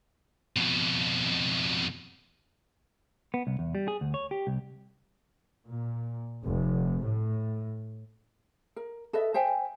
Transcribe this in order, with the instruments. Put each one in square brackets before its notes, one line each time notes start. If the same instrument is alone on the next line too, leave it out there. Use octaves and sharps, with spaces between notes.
[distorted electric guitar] F2 B2
[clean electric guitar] B3
C2
E2
G3
G#4
D2
C#5
G4
C2
[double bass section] A#2
F1
A2
[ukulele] A#4
A4 B4 D#5 E5
C5 E5 G5 G#5